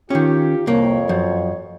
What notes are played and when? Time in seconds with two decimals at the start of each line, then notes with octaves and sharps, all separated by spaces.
0.10 D#3 C#4 F4 G4
0.67 C2 F2 A#3 C#5
1.09 F#2 F3